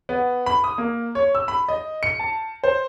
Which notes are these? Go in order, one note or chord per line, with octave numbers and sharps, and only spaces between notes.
B3
B5
D#6
A#3
C#5
E6
B5
D#5
C#7
A5
C5